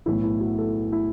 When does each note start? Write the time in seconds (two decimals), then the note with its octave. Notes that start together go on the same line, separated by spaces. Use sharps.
0.06 B1 A2 E3 E4
0.23 E4
0.40 F#4
0.58 A4
0.92 E4